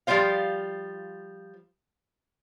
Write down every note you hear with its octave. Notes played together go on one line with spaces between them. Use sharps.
F3 G3 F4 C5 F5